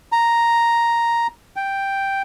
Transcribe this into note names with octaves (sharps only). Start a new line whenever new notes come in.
A#5
G5